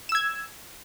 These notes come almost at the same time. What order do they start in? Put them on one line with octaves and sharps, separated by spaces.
E7 E6 G#6